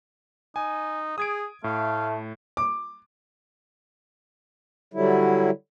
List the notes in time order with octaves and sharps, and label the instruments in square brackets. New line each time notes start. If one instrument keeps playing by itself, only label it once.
[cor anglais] D#4 [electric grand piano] G#5
[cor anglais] G#4 [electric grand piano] D#6 G#6 D7
[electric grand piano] A2 [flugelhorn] A3 [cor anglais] F5
[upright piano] D6
[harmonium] D3 F#3 G3 E4